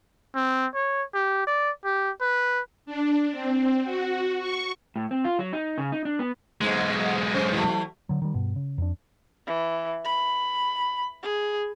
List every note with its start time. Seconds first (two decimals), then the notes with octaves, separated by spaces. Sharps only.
0.35 C4
0.75 C#5
1.14 G4
1.47 D5
1.85 G4
2.21 B4
2.86 D4
3.31 C4
3.84 F#4
4.39 C#6
4.96 A2
5.11 C4
5.24 F4
5.39 F#3
5.53 D#4
5.78 C#3
5.92 D#4
6.05 D4
6.19 B3
6.62 B1 G#2 B2 G#3
7.34 B3 C#4 C5
7.52 E3 F#3 A3
8.09 D3 F#3
8.22 D#3 G3
8.34 G2 B2
8.56 C#3
8.78 F2 D4
9.47 E3
10.05 B5
11.22 G#4